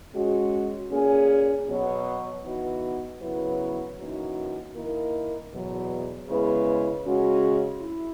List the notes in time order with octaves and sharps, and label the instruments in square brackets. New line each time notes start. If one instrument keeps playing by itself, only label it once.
[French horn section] G#3 C#4 F#4
A#2 A#3 C#4 G#4
B2 F#3 B3 F#4 C#5
E3 B3 D#4 F#4 B4
C#3 F#3 B3 E4 B4
F#2 E3 A#3 D#4 F#4
D#3 A#3 E4 A#4
E2 B2 F#3
C#3 G#3 B3 E4 B4
C#3 G#3 C#4 F#4
E4